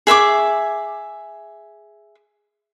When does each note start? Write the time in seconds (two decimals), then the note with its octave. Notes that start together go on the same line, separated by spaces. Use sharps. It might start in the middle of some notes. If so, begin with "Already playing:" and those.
0.07 G#4 E5 C#6 D6